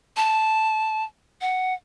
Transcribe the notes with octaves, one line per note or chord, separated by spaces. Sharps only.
A5
F#5